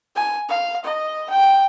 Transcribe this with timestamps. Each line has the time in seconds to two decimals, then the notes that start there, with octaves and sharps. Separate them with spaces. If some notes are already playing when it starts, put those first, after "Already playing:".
0.16 G#5
0.49 F5
0.84 D#5
1.29 G5